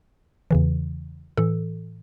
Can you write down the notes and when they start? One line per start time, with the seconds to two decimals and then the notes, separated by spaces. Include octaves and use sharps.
0.51 E2 C#3 E3
1.37 A2 E3 A4